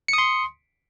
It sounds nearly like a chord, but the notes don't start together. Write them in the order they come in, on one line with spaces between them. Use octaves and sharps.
C#7 D#6 C6